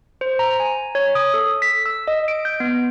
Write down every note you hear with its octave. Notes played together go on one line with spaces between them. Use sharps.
C5
A#5
G#5
C#5
D#6
A4
B6
E6
D#5
D7
G6
B3